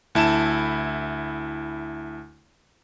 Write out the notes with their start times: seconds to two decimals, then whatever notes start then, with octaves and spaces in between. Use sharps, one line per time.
0.15 D2 E4 A5 E7